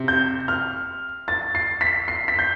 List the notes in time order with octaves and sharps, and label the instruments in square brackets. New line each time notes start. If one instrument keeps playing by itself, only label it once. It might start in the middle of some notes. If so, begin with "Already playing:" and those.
Already playing: [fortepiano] C3
[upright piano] G6
F6
A6
C7
B6
C7
B6
G6